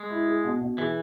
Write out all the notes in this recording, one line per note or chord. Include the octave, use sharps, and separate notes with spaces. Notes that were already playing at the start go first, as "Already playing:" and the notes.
Already playing: G#3
E4
G#4
B2
B2
E3 G#4